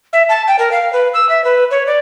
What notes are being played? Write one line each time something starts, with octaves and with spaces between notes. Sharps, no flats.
E5
A5
G5
A#4
F5
B4
E6
E5
B4
C#5
D5